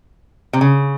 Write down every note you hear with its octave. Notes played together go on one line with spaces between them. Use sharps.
C3
C#3